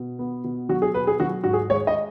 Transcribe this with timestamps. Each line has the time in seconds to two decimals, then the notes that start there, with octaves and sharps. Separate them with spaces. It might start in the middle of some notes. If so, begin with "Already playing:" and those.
Already playing: B2
0.19 B3
0.44 B2
0.69 F#3 F#4
0.82 G#4
0.94 B2 B4
1.07 G#4
1.20 F#3 F#4
1.44 G#2 F#4
1.53 G#4
1.70 G#3 C#5
1.87 D#5